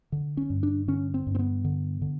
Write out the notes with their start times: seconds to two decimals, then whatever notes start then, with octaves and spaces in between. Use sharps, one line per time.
0.12 D3
0.37 C#4
0.50 G2
0.63 D4
0.88 D3 C#4
1.14 C4
1.27 G2
1.35 C4
1.39 B3
1.64 D3
2.02 D3